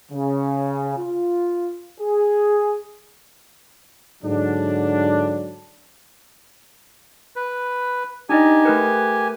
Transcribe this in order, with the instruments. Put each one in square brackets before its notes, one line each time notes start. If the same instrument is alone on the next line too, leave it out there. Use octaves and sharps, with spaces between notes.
[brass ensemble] C#3
F4
G#4
G#2 D3 F#3 D4
[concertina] B4
[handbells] D4 D#4 D#5 [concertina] G4 G#5
[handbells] A3 A#4 B4